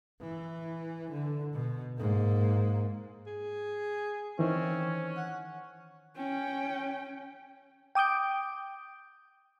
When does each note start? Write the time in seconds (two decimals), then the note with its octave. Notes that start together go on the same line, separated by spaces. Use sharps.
0.21 E3
1.12 D3
1.54 B2
1.98 G#2 A#3
3.26 G#4
4.39 D#3 E3 C4 C#4
5.16 F#5
6.16 C#4 G5
7.95 G5 D6 D#6 G6 D7